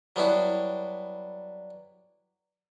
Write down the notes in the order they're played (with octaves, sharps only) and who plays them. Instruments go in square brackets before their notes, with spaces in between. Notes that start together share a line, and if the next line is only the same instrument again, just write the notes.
[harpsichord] F#3 G3 B3 D4 E4 F#4